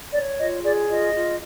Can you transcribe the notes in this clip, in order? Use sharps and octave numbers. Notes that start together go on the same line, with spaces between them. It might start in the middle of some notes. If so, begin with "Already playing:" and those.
C#5 D5
F4 D#5
G#4 D5
F4 D#5
F4